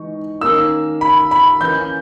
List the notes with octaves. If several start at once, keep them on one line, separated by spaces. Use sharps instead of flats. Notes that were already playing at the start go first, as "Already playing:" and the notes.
Already playing: E3 G#3 D#4 C#6
D#3 A#3 C#4 E6
B5
B5
E3 A#3 C#4 G6